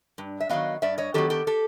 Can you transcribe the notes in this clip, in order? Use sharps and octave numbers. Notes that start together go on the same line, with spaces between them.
G2
E5
D#3 F#3 B3 D#5 F5
G2 D5 E5
C#5 D#5
D#3 F#3 B3 G4 A4
G4 A4
G4 A4